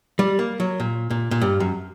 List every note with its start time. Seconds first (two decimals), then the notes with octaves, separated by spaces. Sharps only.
0.19 G3
0.39 A#3
0.60 F#3
0.80 A#2
1.10 A#2
1.31 A#2
1.41 G2
1.60 F#2